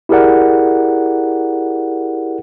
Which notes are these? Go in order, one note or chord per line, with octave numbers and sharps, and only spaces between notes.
E4 G4 G#4 A#4 D5 F#5